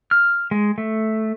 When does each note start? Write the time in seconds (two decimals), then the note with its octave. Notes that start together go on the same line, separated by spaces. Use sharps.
0.11 F6
0.51 G#3
0.78 A3